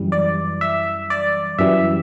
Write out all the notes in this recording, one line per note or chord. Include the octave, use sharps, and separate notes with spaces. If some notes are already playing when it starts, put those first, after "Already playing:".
Already playing: F#2 E3 G3
D5
E5
D5
F#2 E3 G3 E5